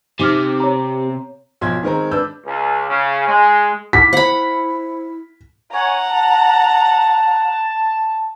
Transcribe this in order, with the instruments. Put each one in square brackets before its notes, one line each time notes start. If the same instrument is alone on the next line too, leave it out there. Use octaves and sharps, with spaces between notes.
[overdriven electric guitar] C3 [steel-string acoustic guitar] C4 G4 [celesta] D#4 D6 F6
[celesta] C#5 A#5
[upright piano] B1 F3 C6 G#6
D#3 G#3 C4 A#5
D4 B4 E6 G6
[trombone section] C#2
C#3
G#3
[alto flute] E4 [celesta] F#5 D6 [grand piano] B6
[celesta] C5 [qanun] F#5 B5
[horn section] C#5 G#5 [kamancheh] F#5 A#5
[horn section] A5